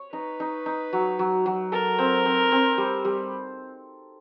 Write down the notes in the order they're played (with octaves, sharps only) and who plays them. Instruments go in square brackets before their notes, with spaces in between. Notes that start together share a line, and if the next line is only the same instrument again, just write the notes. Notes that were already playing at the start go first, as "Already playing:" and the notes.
Already playing: [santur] C#5
[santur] D#4 [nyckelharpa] B4
[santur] D#4
D#4
F#3
F#3
F#3
[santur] A4 [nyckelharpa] A#4
[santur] C4
C4
C4
G3
G3